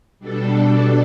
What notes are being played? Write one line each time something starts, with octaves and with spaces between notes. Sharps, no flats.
B2 G3 D4 A4